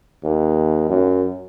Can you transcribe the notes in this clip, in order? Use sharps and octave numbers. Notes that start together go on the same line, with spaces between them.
D#2
F#2